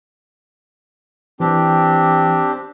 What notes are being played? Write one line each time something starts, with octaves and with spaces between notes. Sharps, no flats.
E3 C4 D4 G4